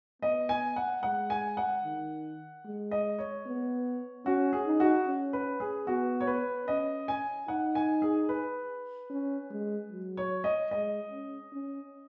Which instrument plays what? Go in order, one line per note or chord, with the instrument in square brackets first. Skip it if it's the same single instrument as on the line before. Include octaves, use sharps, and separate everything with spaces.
[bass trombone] B3 [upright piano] D#5
[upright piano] G#5
F#5
[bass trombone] G#3 [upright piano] F#5
[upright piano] G#5
F#5
[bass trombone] D#3
G#3
[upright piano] D#5
C#5
[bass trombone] B3
[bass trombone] C#4 [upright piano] F#4
[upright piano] G#4
[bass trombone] D#4
[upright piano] F#4
[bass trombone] C#4
[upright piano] B4
G#4
[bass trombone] B3 [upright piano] F#4
[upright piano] C#5
B4
[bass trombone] C#4 [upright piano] D#5
[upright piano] G#5
[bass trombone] D#4 [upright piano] F#5
[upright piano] G#5
G#4
B4
[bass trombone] C#4
G#3
F#3
[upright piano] C#5
D#5
[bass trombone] G#3 [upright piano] D#5
[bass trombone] C#4
C#4